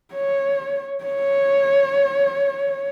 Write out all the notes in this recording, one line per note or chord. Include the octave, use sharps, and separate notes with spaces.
C#5
C#5